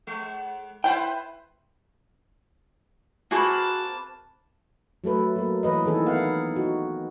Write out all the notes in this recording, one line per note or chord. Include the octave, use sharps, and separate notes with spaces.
G#3
E4 B4 C5 G5
A#3 C4 F#4 G#4 B4 A5
F#3 A3 A4 B4
F#3 A#3
E3 B4 D#5
D#3 E3 C4 G#4 A4
B3 D#4 F5 F#5
D#4 F#4